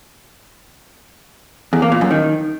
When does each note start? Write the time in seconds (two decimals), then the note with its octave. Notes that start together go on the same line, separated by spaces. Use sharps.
1.73 E2
1.82 A#3
1.92 A#2
2.01 F#2
2.11 D#3